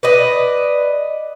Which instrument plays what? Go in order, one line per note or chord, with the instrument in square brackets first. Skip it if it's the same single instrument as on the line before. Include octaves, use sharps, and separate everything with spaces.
[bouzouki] B4 D5 D#5